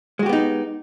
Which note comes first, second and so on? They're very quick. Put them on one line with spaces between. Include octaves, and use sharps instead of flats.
G#3 F#4 G4 B3 D#4